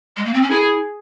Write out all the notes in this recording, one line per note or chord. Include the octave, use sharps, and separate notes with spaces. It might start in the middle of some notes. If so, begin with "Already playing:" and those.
G#3
A#3
C4
C#4
E4 G#4